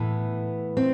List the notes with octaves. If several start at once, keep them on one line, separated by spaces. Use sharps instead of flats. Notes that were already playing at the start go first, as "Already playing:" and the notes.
Already playing: A2 E3 B3
C4